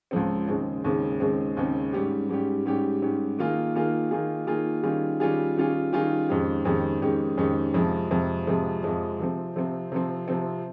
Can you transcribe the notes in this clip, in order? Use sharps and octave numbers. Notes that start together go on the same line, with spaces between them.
C#2 C#3 F3 C4
D#2 C#3 G#3 C4
D#2 C#3 G#3 C4
D#2 C#3 G#3 C4
D#2 C#3 G#3 C4
G#2 G3 C#4 G4
G#2 G3 C#4 G4
G#2 G3 C#4 G4
G#2 G3 C#4 G4
D#3 A#3 F4 G#4
D#3 A#3 F4 G#4
D#3 A#3 F4 G#4
D#3 A#3 F4 G#4
D#3 G3 C#4 F4 G#4
D#3 G3 C#4 F4 G#4
D#3 G3 C#4 F4 G#4
D#3 G3 C#4 F4 G#4
F2 D#3 G#3 C#4 G4
F2 D#3 G#3 C#4 G4
F2 D#3 G#3 C#4 G4
F2 D#3 G#3 C#4 G4
F2 C3 F3 G#3
F2 C3 F3 G#3
F2 C3 F3 G#3
F2 C3 F3 G#3
C3 F3 C4
C3 F3 C4
C3 F3 C4
C3 F3 C4